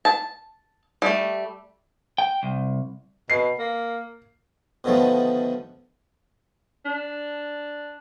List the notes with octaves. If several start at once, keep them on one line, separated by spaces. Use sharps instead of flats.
A5
G3 A3
G5
C2
B2 C7
A#3
B2 D3 D#3 F3 A3 B3
D4